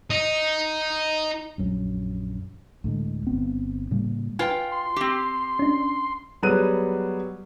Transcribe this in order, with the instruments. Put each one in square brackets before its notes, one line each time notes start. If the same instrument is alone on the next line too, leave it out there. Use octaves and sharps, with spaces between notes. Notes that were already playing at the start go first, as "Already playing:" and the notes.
[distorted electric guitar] D#4
[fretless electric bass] A#1 F#2 F#3
D2 A2 D3 G#3
G1 B3 C4
A2 C#3 G3 A#3
[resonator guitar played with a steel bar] F4 G5 [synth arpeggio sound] B4 G#5
[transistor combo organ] C6
[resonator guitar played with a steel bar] C4 G4
[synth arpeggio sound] C#4 D4
[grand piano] F#3 G3 B3 G#4 F#6 D#7